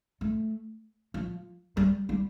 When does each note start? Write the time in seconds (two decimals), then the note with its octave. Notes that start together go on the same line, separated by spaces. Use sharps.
0.21 A3
1.14 F3
1.77 G3
2.09 G3